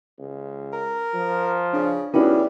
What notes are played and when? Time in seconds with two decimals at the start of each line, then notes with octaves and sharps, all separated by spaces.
0.19 C#2
0.73 A#4
1.14 F3
1.73 C#3 D4
2.14 E2 G3 C#4 D#4 E4 F#4 B4